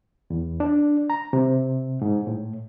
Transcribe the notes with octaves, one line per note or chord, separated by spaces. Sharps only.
E2
D4
A#5
C3
G#2
A2